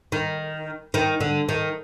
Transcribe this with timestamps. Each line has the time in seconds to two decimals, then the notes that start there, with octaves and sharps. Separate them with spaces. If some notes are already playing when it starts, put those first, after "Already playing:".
0.12 D#3
0.94 D#3
1.21 D3
1.49 D#3